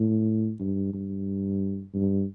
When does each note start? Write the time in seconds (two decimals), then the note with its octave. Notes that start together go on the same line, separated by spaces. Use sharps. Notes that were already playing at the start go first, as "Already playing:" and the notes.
Already playing: A2
0.60 G2
0.94 G2
1.94 G2